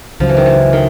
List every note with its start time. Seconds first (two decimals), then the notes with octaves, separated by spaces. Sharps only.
0.20 C#2 C#3 F3 F#3
0.29 E3
0.37 D#3
0.46 E3
0.73 D#3